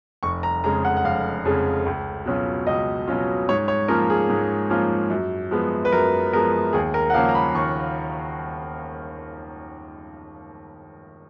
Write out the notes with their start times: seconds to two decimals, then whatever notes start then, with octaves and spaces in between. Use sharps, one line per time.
0.23 F1 C#6
0.43 A#5
0.64 F2 C#3 G#3 A#5
0.85 F#5
0.97 F#5
1.04 F1 F5
1.45 F2 C#3 G#3
1.86 C#2
2.26 B2 F#3 C#4 F4
2.67 C#2 D#5
3.08 B2 F#3 C#4 F4
3.49 G#2 C#5
3.68 C#5
3.88 F3 A#3 C#4 F4 A#4
4.10 G#4
4.29 G#2
4.70 F3 A#3 C#4 F4
5.10 F#2
5.51 F3 G#3 B3
5.85 B4
5.92 F#2 A#4
6.33 F3 G#3 B3 A#4
6.73 D#2 G#4
6.94 A#4
7.10 F#5
7.14 C#3 F3 A#3 C#4 F5
7.29 A#5
7.35 B5
7.54 D#2 C#6